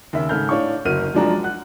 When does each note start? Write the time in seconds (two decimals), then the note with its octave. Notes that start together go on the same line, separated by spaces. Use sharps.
0.13 D#2 C#3 E5
0.29 G#2 C#3 A4 F6 G6
0.49 A2 D4 C#5 F5 C#6
0.85 F#1 D2 F#3 A#4 F6 D#7
1.14 F#2 F3 G#3 D4 F#4 A#5
1.43 F#5 F#6